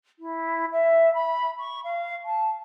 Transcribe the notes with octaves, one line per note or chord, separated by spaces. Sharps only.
E4
E5
B5
C#6
F5
A5